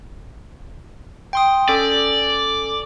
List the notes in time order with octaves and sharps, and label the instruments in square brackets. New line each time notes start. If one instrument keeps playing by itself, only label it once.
[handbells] G5 C6 D#6
[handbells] C#4 A4 [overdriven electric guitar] D5